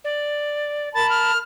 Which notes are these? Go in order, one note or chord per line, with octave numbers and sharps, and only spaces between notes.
D5
A#4 A5 B5 A6
F6